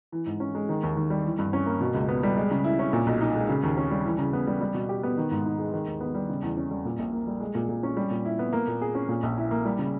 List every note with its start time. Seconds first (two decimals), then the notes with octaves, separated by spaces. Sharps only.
0.12 E3
0.26 G#2
0.40 C#4
0.55 G#3
0.69 D#3
0.83 D#2
0.97 D#2
1.10 G3
1.25 E3
1.39 G2
1.53 C#4
1.66 A#3
1.81 B2
1.94 C#2
2.08 B3
2.23 G3
2.37 G#3
2.51 C#3
2.64 E4
2.79 C#4
2.93 A#2
3.06 B1
3.21 D#4
3.35 G#3
3.49 C#3
3.63 D#2
3.77 C#4
3.91 G3
4.05 E3
4.19 C#3
4.33 B3
4.47 G3
4.61 G3
4.74 B2
4.89 G4
5.03 B3
5.17 D#3
5.31 G#2
5.45 D#4
5.59 G#3
5.73 D#3
5.87 D#2
6.01 B3
6.15 G3
6.30 C#3
6.43 E2
6.57 C#4
6.71 G3
6.85 A#2
6.99 A#1
7.13 A#3
7.27 G3
7.40 G#3
7.55 A#2
7.69 A#2
7.83 C#4
7.97 G3
8.11 A#2
8.25 E4
8.39 B3
8.53 A#3
8.67 A#2
8.82 G#4
8.95 C#4
9.09 A#2
9.23 A#1
9.38 E4
9.51 A#3
9.65 G3
9.79 C#3